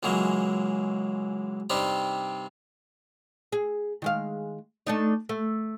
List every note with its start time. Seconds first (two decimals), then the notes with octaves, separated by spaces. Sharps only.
0.03 C#2 E3 F#3 G#3 A#3
1.70 G2 C3 G3 C4 D#4 G4
3.52 G#4
4.02 D#3 G#3 F5
4.87 A3 D4 D#4
5.29 A3